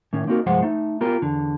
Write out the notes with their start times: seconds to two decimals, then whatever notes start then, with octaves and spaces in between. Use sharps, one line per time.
0.13 A2 D#3 C#4
0.27 A#3 C4 D#4 F#4 A4 A#4
0.46 C2 G2 F3 G#3 C5 F#5
0.62 A3 D#4
1.01 B3 F4 G4 A#4
1.22 E2 D3